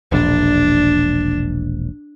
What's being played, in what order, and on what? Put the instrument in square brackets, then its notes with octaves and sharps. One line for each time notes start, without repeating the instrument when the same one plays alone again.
[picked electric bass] E1 A#1 [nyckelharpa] D4